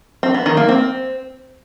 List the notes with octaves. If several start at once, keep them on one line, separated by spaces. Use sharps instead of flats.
C4
B3
D#3
A#3
C4